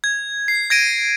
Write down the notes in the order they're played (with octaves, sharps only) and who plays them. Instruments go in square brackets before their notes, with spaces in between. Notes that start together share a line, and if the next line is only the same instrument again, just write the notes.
[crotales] G#6
C7
G#6 A#6 D7 D#7